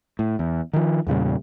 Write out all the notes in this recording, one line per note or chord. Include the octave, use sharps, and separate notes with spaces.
A2
E2
D#3 F3
E2 A#2 C#3 G3